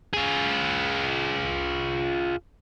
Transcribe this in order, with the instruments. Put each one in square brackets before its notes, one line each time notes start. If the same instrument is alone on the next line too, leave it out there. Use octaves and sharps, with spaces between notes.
[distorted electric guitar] F4 G#4